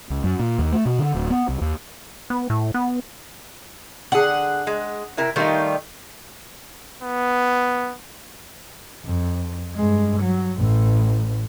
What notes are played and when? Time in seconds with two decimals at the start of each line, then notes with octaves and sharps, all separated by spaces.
0.10 C#2
0.24 F#2
0.39 A#2
0.59 D#2
0.73 A3
0.85 B2
0.99 D3
1.14 D1
1.31 B3
1.48 C2
1.61 D#2
2.30 B3
2.50 A2
2.74 B3
4.12 D3 G#4 F#5
4.67 G#3
5.17 C3 E4 A#4
5.36 D#3 G3 A3 D#4 F4
7.02 B3
9.04 F2
9.74 G2 G#3
10.21 F#3
10.57 A1 A2